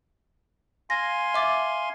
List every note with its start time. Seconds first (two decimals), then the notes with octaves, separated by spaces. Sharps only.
0.90 F5 G#5 C6 A#6
1.34 E5 D6 A6